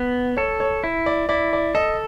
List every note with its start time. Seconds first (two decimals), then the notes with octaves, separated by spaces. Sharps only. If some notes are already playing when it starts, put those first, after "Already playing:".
Already playing: B3
0.37 A4 C#5
0.60 C#5
0.84 E4
1.06 D5
1.29 E4 D5
1.53 D5
1.75 A4 D#5